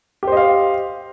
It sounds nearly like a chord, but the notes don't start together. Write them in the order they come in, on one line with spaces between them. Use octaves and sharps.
G4 C5 D#5 F5